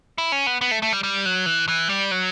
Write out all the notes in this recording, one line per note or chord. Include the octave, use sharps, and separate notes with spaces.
E4
C#4
B3
B3
A3
A3
G3
G3
F#3
E3
E3
G3
F#3